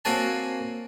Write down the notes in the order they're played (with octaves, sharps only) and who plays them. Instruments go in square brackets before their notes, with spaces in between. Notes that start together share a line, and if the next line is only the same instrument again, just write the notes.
[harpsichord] A#3 C4 F#4 C#5 G#5 A5